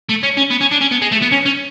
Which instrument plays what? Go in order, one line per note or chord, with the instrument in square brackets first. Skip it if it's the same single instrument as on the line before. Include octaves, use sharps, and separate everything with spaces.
[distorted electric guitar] A3
C#4
C#4
B3
C#4
D4
C#4
B3
G#3
A3
B3
C#4
C#4